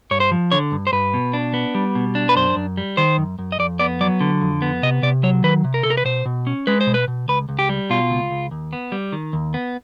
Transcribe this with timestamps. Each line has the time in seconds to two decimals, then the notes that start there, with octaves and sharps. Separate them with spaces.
0.11 G2 C#5
0.20 C5
0.31 F3
0.51 D3 C#5
0.72 G2
0.87 C5
0.92 G2 B4
1.14 B2
1.33 D4
1.54 B3
1.75 G3
1.95 B2
2.15 D4
2.29 B4
2.36 F#2 C5
2.56 F#2
2.77 G3
2.97 D#3 C5
3.18 F#2
3.39 F#2
3.52 D#5
3.59 F2 D5
3.79 B3 D5
4.01 F#3 D5
4.21 D3
4.42 F2
4.62 B3
4.83 C3 D#5
5.03 C3 D5
5.23 F#3 C#5
5.44 D#3 B4
5.64 C3
5.74 A#4
5.83 C3 A4
5.90 A#4
5.97 B4
6.05 B2 C5
6.26 B2
6.47 C#4
6.67 G#3 B4
6.81 C5
6.87 B2
6.94 B4
7.08 B2
7.28 C#2 B4
7.49 C#2
7.59 G4
7.69 G3
7.90 B2 F4
8.10 C#2
8.31 C#2
8.51 D#2
8.73 B3
8.92 G3
9.12 D#3
9.33 D#2
9.54 B3